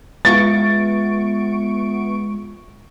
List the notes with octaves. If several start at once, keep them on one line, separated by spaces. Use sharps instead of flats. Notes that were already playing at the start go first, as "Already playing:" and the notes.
G#3 B3 F4 G#4 E5 C#6 A6 D7